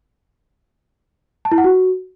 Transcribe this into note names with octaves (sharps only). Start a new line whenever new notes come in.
A5
E4
F#5
F#4